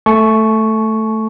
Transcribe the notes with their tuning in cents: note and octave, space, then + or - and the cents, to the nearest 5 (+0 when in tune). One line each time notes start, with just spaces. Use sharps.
A3 +0 A5 -40 C#6 +0